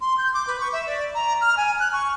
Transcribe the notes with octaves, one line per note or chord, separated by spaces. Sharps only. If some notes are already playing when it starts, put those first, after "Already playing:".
C6
G6
D6
B4
C#6
E5
D5
A#5
F6
G#5
F#6
C#6